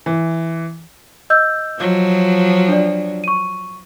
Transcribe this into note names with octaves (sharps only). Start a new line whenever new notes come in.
E3
D#5 E6 G6
F3 F#3
D4 D5
C#6 D#7